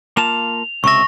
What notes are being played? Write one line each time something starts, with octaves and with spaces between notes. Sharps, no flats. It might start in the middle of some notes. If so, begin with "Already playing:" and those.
A#3 F4 A5 F7
C#2 C3 E5 C#6 A#6